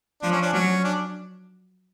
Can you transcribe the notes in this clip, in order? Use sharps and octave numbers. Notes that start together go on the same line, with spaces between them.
F3 D4
C#4
D4
F#3 C#4
D4